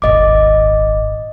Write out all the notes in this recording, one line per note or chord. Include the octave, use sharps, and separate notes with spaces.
D#1 G#1 D#5 D6